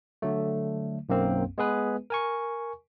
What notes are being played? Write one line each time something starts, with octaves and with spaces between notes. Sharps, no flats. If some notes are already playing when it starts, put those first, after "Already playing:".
D3 F#3 A3
B1 F#2 A#3 C4
G#3 B3 G#4 B4
A#4 G#5 C#6